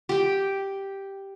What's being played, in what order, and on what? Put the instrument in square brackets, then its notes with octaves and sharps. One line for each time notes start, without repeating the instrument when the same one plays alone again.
[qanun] G4 G5